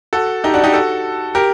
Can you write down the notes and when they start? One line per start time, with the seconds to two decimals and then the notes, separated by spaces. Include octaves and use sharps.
0.13 F#4 A4
0.44 D#4 G4
0.54 D4 F#4
0.64 D#4 G4
0.73 F#4 A4
1.35 G4 A#4